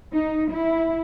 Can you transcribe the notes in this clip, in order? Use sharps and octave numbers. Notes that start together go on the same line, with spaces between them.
D#4
E4